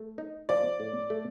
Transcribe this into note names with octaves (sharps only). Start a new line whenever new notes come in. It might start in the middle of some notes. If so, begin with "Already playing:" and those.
Already playing: A3
D#4
F3 D5
A2
A3